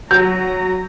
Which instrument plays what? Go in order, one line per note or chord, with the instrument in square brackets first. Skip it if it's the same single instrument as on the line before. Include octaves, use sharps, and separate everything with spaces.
[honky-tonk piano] F#3 [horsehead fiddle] A#5 [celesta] G6